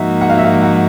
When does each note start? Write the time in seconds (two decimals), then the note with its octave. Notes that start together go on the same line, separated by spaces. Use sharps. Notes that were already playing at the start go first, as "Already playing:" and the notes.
Already playing: G#2 F3 A#3 D#4 F#4 E5
0.21 F#5
0.29 F5
0.37 E5
0.44 F5
0.63 F#5